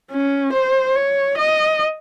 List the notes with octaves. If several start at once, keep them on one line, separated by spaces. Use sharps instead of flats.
C#4
C5
C#5
D#5